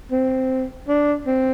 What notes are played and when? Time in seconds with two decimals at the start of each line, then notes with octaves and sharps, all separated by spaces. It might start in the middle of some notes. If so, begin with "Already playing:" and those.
0.11 C4
0.88 D4
1.26 C4